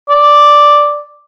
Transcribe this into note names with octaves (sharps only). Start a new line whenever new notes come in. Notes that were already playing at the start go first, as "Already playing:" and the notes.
D5